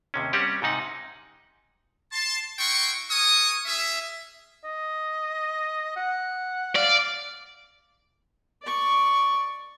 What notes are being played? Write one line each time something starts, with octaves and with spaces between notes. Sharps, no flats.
D#2 C3 C#4
G3 C4 C#4 G4 F#5
G#2 C3 D#4 F#5
A5 C6
E4 F#4 G5 C6 C#6
A#4 G#5 C#6 D#6
C#4 G#4 E5
D#5
F#5
D5 F5
D5 C#6